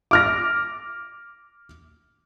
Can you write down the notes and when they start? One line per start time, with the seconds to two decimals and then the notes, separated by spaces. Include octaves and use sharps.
0.11 D6 F6 A#6